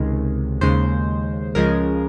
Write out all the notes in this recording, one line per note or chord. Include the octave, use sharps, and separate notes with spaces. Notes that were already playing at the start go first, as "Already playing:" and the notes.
Already playing: C#2 C3 D#3 G#3
D#2 C#3 G#3 C5
C#2 C#3 F3 G#3 A#4